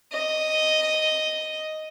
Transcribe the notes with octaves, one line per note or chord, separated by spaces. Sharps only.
D#5